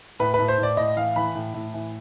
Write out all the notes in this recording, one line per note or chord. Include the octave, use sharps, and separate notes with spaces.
A2 B4
A2 B4
C5
A2
D5
A2 D#5
E3 F5
E3 B5
A2
A2
E3